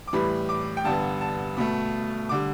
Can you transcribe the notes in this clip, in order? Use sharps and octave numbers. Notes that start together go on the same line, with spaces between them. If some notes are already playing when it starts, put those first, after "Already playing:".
D6
A2 E3 G3 B5
D6
G5
G2 D3 G3 B3 A5
A5
B2 A3 B5
D3 G3 D6